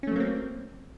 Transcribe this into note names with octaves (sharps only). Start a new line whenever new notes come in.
F#3 A3 A#3 C4 C#4